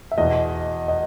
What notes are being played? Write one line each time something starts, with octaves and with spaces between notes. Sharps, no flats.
E5
E2 B2 D#5
D#5